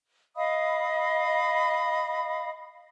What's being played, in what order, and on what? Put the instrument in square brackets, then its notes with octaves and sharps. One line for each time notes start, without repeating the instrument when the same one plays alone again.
[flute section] D#5 F5 B5 D#6